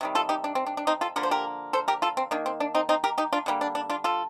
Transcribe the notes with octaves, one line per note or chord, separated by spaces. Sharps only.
C3 D#3 G3
F4 A4
D#4 G4
D4
C4
D4
D4
C4 D#4
F4 A4
D3 F3 A#3 A#4
C5
G4 A#4
A4 C5
G4 A#4
F4 A4
C4
D#3 A#3 D4
C4
D4
C4 D#4
C4 D#4
G4 A#4
D#4 G4
D4 F4
D3 G3 A#3
D4
D4
D4 F4
F4 A4